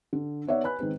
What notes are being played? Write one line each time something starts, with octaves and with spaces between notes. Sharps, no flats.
D3
B3 D#4 C#5 D5 E5 F#5
B4 G#5 B5 F#6
D#3 G#3 C4 B4